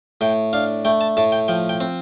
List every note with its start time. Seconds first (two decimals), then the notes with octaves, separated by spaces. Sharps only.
0.21 A2 G5
0.53 D4 F5
0.85 A3 G5
1.01 A5
1.17 A2 A5
1.32 G5
1.48 F3 G5
1.69 G5
1.81 C4